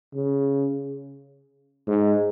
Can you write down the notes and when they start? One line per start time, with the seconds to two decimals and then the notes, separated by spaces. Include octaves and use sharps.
0.15 C#3
1.87 G#2